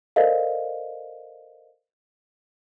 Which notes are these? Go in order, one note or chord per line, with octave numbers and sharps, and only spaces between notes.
A4 A#4 C5 D5 D#5 F5